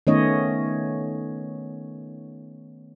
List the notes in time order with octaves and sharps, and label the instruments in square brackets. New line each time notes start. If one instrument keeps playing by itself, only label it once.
[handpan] D#3 A3 B3 C#4 C#5 D#5